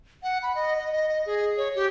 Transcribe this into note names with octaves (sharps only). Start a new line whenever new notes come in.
F#5
B5
D#5
D#5
D#5
D#5
G#4
C#5
G4